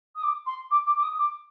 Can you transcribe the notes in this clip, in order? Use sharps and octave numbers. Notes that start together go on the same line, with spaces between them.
D#6
D6
C6
D6
D6
D6
D#6
D6